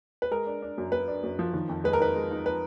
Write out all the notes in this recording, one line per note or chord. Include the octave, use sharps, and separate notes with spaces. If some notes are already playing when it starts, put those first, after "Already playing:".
B4
G#3 A#4
D4
D4
F#2
F#2 B4
D4
F#2
F3
D#3
F2
G#3 B4
A#4
D#4 B4
G#3
D#4
B4